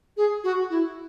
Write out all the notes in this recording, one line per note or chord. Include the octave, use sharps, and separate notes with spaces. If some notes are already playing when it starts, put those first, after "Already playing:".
G#4
F#4
E4